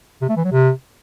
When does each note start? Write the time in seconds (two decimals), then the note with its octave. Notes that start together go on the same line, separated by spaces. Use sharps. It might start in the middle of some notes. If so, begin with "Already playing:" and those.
0.22 C3
0.29 A3
0.37 E3
0.44 F#3
0.52 C3